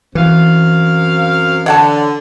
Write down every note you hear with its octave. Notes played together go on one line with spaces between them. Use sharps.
F#2 E3 C4 F5
D3 C#5 F#5 A5